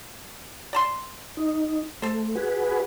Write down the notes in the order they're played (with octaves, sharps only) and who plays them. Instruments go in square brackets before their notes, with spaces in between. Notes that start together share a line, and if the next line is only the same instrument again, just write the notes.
[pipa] D5 A5 C6
[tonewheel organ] D#4
[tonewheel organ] A3 [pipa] A4 C5
[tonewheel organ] F#4 G#4 B4